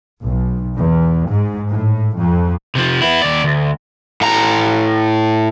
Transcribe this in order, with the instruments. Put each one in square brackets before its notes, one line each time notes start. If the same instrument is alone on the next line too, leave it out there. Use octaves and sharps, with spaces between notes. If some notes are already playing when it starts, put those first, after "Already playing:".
[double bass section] B1
E2
G#2
A2
F2
[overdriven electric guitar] C3 F3
B3 E4
D#2 D5
D2
A2 A#5